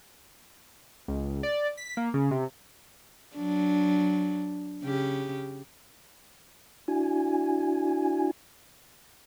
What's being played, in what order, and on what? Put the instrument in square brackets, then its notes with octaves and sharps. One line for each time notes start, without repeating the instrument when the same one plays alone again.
[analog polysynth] C#2
D5
B6
A#3
C#3
C3
[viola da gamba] F#3 D4
C#3 G4
[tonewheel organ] D4 E4 F#4 G#5